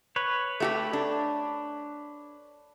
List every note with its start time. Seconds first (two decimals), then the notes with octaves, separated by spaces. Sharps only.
0.16 B4 C#5
0.60 A3 F#4 G4
0.93 D4